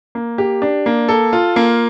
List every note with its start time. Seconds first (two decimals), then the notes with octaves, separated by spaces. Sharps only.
0.15 A#3
0.38 G4
0.62 D4
0.86 A#3
1.09 A4
1.33 F4
1.56 A#3